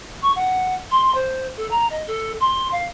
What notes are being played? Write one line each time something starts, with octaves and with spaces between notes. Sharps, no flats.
C#6
F#5
C6
C5
A4
A#5
D#5
A4
C6
F5